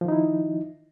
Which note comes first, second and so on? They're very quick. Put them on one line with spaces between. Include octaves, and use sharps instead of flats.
F3 D#3 D#4 E4